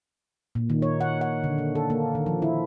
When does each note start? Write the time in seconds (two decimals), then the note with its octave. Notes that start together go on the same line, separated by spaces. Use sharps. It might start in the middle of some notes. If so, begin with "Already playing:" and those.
0.55 A#2
0.70 D#3
0.82 C#5
1.01 F#5
1.21 F#5
1.44 D3
1.58 A#3
1.75 A4
1.90 A#3
2.15 D#3
2.26 F3
2.42 E4